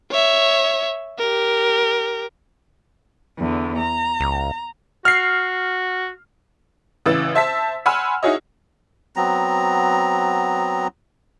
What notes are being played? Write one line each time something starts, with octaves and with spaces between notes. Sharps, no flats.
C#5 E5
G4 A#4
E2 D3
A#5
C#2
F#4 F6 C7
A1 C#3 E3 E6 A6
C5 E5 A5 E6 B6
F#5 G#5 B5 C6 E6 F6
D#4 E4 F#4 G#4 C#5 D#5
F#3 B3 C4 A#5